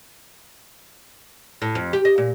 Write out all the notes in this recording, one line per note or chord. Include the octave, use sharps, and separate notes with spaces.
A2
F2
G4
D#5
A#2